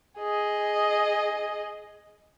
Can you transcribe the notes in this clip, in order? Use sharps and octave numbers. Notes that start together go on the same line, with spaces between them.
G#4 D#5